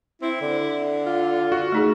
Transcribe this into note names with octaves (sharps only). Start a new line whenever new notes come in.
C4 E4
D3
F4
F#4
A3 D#4 G#4